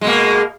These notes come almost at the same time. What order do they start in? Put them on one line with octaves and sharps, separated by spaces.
G#3 B2 A#3